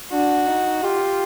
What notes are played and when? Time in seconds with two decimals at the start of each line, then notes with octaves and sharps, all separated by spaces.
0.12 D4 F#4
0.47 D#4
0.83 F4 G4